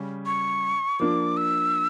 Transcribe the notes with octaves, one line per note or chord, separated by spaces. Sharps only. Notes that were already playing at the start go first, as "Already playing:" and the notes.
Already playing: C#3 G3 C#4
C#6
F3 A#3 D4 D6
E6